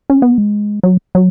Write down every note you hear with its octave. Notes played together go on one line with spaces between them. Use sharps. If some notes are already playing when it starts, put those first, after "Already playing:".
C#4
B3
G#3
F#3
F#3